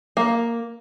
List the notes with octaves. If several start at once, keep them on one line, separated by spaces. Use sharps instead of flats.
A#3